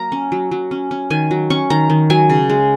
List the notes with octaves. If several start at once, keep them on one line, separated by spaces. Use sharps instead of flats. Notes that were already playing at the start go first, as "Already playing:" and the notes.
Already playing: F#3 A#3 A#5
C#4
F#3
F#3
C#4
C#4
D#3 G#5
F#3
C#4 C#6
D#3 A#5
D#3
F#3 G#5
C#3
G#3